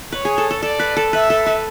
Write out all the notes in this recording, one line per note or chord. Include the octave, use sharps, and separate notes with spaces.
B4 C#5
G#4
A4
A4
A4 D5
B4
A4
B4 E5
A4
B4